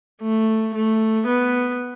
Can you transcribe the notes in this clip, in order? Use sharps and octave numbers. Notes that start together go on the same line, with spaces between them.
A3
A3
B3